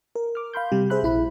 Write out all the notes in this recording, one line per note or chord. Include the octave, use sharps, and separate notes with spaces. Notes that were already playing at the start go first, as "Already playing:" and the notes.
A#4
D6 F6
F5 B5 C6 G6
C3 G3 G4
G#4 C5 E5 B5 F#6
A#1 E4 B5